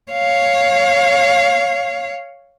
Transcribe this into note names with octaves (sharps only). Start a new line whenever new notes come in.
C#5 F5